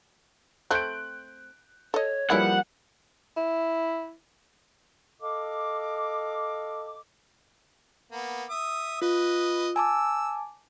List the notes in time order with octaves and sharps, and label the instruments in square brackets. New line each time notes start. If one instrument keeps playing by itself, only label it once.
[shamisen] A3 C4 [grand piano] F#6 G6 D7
[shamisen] A4 D#5 [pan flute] C#5
[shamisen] E3 E4 G#4 [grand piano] F3 G3 A#3 [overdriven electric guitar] F#5
[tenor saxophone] E4
[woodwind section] A4 D#5 F5 D6
[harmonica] A#3 B3
E5 D#6
[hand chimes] F4 [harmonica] B4 D#5
[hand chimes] G#5 A5 D6 [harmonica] E6